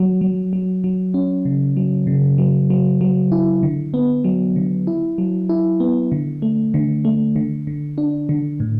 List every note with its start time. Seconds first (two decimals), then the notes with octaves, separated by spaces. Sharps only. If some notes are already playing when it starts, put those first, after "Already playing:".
Already playing: F#3
0.21 F#3
0.53 F#3
0.84 F#3
1.14 C#4
1.45 C#3
1.77 F#3
2.07 C#3
2.38 F#3
2.70 F#3
3.01 F#3
3.32 E4
3.63 D3
3.94 B3
4.24 F#3
4.56 D3
4.87 E4
5.18 F#3
5.49 E4
5.80 B3
6.12 D3
6.42 A3
6.74 D3
7.05 A3
7.36 D3
7.67 D3
7.98 D4
8.29 D3
8.60 A2